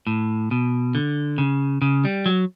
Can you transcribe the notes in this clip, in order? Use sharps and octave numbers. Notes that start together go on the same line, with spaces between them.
A2
B2
D3
C#3
C#3
G3
F#3